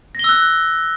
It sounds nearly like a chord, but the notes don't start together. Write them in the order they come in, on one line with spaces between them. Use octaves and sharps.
A#6 G7 E6 F#6